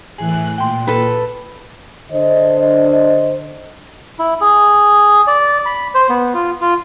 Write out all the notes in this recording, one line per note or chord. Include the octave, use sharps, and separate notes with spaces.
A2 E3 G#4 F#6
A#2 G5 C6
A4 B4
D3 D4 C5 D#5
E4
G#4
D5
B5
C5
B3
F4
F4